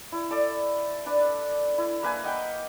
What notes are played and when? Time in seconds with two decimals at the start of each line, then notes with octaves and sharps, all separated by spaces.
0.12 E4
0.31 A4 D5
1.06 D4 B4
1.78 E4
2.03 A#3 B4 G#5
2.24 D#5 F#5 G5